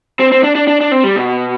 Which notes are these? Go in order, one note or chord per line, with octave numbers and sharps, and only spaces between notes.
C4
C4
D4
D4
D4
D4
C4
G3
B2